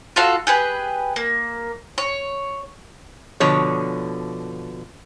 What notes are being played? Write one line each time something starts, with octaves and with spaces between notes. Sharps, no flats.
F4 F#4 A4 F5
G4 G#4 B4
A#3
C#5
B2 D3 F3 C#5